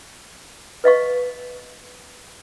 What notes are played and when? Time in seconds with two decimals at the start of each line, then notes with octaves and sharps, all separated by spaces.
0.84 B4 D#5 F5 C#6